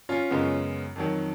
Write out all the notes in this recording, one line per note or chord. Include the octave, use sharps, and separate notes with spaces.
C#4 F4
F#2 C#3 G#3 B3
F2 D#3 F#3